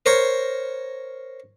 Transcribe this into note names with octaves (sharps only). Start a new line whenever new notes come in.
A#4 C5 C#5